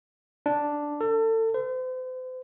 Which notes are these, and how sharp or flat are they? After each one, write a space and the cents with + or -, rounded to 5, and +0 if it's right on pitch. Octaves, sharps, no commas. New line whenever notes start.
D4 +0
A4 +30
C5 -40